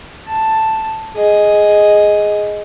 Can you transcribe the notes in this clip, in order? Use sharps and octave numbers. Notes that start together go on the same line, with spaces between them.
A5
G#4 D#5